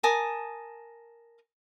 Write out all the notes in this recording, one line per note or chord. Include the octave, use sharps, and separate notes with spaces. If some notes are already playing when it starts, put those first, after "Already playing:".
A#4 G#5 A5 D#6